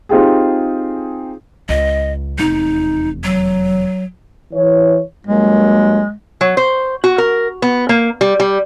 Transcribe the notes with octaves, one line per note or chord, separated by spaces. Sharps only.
C4 D#4 F4 G4 G#4
C#2 D#5
F1 E2 D#4
F#3
E3 C#5
G2 F#3 G#3 A#3
F#3
C5
F#4
A#4
B3
A#3
G3
G3